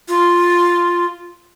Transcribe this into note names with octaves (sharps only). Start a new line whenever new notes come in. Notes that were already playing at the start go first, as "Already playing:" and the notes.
F4